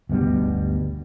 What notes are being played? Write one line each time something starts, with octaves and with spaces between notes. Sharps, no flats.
G1 D2 B2 G3